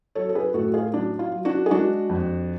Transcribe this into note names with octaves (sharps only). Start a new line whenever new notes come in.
F#3 A4 C#5
A4
G#4 B4
A2 F#4 A4
F4 G#4
F#3 D4
F4
F#3
D4 F#4
G#4
G#3 D4 F#4
F2